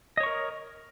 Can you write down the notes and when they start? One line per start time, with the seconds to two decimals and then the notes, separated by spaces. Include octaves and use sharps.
0.17 D#5
0.20 C#5
0.23 C#6
0.26 A#4